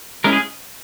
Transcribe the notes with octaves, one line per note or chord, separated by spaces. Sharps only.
G#3 C#4 E4 A#4
G#4